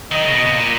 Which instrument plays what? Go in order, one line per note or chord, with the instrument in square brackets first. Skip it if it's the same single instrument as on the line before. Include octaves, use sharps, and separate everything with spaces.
[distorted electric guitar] D#3 [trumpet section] D#5
[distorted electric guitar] C#3
B2
B2
A#2